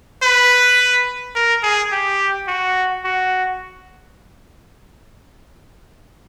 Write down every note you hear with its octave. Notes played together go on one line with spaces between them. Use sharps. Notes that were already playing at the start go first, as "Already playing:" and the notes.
B4
A#4
G#4
G4
F#4
F#4